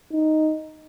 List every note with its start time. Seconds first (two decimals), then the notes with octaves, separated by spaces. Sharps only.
0.13 D#4